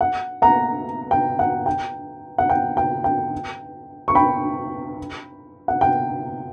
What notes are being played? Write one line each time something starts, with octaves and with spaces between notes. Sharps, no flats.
F#5
F#5 A#5
G5
F#5
G5
F#5
G5
G5
G5
C#6
G5 B5
F#5
G5